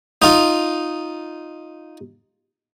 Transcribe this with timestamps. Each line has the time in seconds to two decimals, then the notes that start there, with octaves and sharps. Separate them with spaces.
0.22 D#4 F4